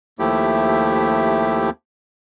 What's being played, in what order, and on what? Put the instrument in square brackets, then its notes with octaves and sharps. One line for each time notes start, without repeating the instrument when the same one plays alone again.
[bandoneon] D#2 F3 A3 E4 G4